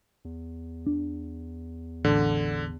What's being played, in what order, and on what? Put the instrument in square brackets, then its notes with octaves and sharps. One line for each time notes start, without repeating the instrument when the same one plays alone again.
[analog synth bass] E2
[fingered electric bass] D4
[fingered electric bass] A1 [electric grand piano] D3